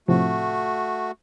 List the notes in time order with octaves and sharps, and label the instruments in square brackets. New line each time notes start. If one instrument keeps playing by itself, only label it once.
[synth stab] A2 C3 F3 [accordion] A3 F#4